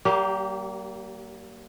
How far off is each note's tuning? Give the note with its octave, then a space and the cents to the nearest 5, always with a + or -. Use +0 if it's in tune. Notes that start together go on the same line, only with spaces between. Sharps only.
G3 -40 A#3 +0 G4 +0